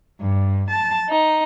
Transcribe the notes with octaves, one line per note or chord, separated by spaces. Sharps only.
G2
A5
D#4